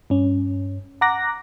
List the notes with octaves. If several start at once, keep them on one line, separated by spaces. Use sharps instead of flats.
G2 C#4
F#5 A#5 D6 F#6 A#6